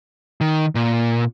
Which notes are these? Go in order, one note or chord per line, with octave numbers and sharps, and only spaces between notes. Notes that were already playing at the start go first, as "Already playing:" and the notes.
D#3
A#2